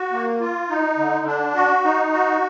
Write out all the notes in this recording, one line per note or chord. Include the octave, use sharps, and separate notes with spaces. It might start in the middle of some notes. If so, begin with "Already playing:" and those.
Already playing: F#4
A#3
F4
D#4
D3
D4
F#4
D#4
F#4